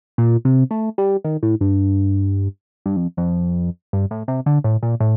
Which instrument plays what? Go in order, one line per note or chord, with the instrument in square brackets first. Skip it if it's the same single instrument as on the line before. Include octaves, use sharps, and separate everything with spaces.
[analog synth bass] A#2
C3
A3
G3
D#3
A2
G2
G2
F2
F2
G2
A2
C3
D3
A2
A#2
A2